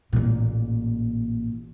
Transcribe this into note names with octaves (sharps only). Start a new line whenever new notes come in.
A1 A#2